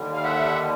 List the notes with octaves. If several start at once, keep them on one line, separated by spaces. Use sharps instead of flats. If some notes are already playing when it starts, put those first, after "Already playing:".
Already playing: D#2 D3 G3
F5
E5 F#5